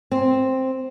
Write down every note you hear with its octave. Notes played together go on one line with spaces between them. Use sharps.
C4